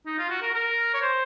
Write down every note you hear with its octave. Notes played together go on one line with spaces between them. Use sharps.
D#4
F4
F#4
A#4
A#4
C#5
C5